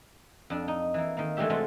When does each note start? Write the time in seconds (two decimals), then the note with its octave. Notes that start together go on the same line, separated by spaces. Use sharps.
0.50 F2 D4
0.68 D#4
0.94 E3 A#3
1.17 D#3 A#3
1.37 E3 G#3 A3 D4 G4 E5
1.50 C3 G#3 A3 F4 F#4